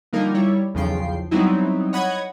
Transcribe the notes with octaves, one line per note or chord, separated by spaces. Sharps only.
D3 F3 G3 A#3 D#4 A#4
G3 E4 C#5
B1 E2 C#3 F3 G5 C7
F#3 G3 B3 C4 D#4 E4
C#5 D#5 F#5 B5 D#6 G#6